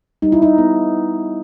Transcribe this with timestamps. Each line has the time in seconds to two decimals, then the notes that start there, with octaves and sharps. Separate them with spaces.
0.22 G3 D#4
0.32 E4
0.42 D#4
0.58 B3